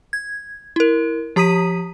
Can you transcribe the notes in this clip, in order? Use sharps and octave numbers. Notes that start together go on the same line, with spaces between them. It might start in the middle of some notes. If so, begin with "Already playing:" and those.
G#6
E4 A#4
F3 G4 A#5 D#6 B6 D#7